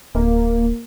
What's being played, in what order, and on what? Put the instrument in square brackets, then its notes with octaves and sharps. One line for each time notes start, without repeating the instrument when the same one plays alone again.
[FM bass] D1 [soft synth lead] A#3